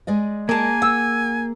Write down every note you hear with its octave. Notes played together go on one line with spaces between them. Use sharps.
G#3 D5 D#5
A#3 G#4 A#4 G#5 A5
F#5 E6